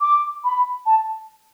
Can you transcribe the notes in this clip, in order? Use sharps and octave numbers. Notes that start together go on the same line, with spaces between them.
D6
B5
A5